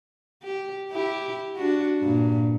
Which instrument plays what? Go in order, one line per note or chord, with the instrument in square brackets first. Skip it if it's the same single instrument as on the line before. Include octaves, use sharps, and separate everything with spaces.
[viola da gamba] G4
E4 G4
D4 F#4
G2 A#2